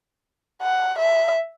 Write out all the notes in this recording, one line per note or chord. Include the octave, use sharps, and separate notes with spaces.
F#5
E5